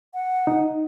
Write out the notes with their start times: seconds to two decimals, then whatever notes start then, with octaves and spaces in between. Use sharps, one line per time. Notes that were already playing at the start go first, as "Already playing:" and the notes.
0.14 F#5
0.47 D#4